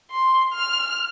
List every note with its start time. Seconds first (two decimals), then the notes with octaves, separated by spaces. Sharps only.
0.11 C6
0.53 F6